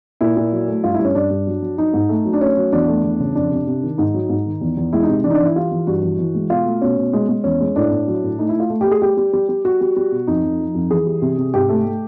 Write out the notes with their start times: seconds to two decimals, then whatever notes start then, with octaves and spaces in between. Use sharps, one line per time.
0.21 A#2 E4
0.37 A#2
0.52 F#3
0.68 A3
0.83 G2 F4
0.94 G2 E4
1.05 C#4
1.15 G2 D4
1.31 G2
1.47 F#3
1.62 F#3
1.78 F#3 D#4
1.94 G#2
2.09 A3
2.25 F#3
2.33 D4
2.41 A3 C#4
2.57 F#3
2.72 E2 D4
2.88 A3
3.04 E2
3.20 C#3
3.35 F2 D4
3.51 C3
3.67 C3
3.83 D#3
3.98 G#2 D#4
4.14 F#3
4.30 G#2
4.46 D#3
4.61 E2
4.77 E2
4.93 G#3 E4
5.03 D#4
5.09 C3
5.24 E3 D4
5.31 D#4
5.34 D4
5.40 E3
5.45 E4
5.56 G3 F4
5.72 E3
5.87 G2 F#4
6.02 E3
6.19 E3
6.34 G#3
6.50 B2 F4
6.65 A3
6.82 B2 C#4
6.97 B2
7.13 G#3
7.29 G#3
7.44 E2 C#4
7.60 G#3
7.76 A2 D4
7.91 A2
8.08 F#3
8.23 A2
8.39 A3 D#4
8.49 E4
8.55 A3 F4
8.70 A3
8.81 G4
8.86 A3
8.91 G#4
9.02 G3 G4
9.17 G3
9.33 G3
9.49 G3
9.65 G3 F#4
9.81 G3
9.96 G3
10.11 B2
10.27 F2 D#4
10.43 F2
10.59 F3
10.75 F2
10.90 E3 G#4
11.06 G3
11.22 C3
11.38 C3
11.54 G#2 G4
11.69 A3
11.85 A3